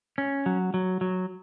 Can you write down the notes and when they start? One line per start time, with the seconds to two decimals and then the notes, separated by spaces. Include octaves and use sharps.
0.18 C#4
0.46 F#3
0.74 F#3
1.01 F#3